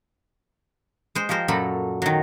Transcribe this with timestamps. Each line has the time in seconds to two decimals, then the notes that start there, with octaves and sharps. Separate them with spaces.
1.15 G#3 C5
1.29 F3 G4 A#4 C5
1.48 F#2 A#2 F#3 A4 B5
2.02 D#3 F#3